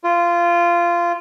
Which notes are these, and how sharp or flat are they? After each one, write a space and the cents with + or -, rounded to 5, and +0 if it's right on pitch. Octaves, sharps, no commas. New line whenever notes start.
F4 -15